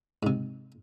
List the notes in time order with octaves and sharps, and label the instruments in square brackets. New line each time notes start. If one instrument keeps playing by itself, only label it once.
[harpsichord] G#2 C3